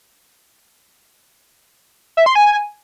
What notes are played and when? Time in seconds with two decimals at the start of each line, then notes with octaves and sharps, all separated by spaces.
2.17 E5
2.26 C6
2.35 G#5